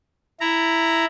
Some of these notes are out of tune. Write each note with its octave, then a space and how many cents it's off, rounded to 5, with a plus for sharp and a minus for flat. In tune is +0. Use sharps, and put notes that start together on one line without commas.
E4 +0 A#5 -5